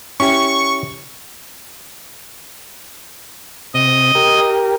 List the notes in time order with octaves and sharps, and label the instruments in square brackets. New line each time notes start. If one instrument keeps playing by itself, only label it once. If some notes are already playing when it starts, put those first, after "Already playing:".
[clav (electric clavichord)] C#4 E4 G4 [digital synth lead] C#6
[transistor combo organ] C3 [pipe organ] D#5
[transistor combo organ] G4 A#4